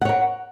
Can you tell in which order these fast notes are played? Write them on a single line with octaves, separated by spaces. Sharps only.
F#5 C#5 A#4